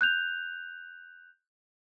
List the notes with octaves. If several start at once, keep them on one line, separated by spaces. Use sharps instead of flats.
F#6 G6 F7